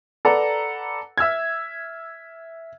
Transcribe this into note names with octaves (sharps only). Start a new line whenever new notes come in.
A4 B4 D5 F#5 A#5
E5 E6 F6 G#6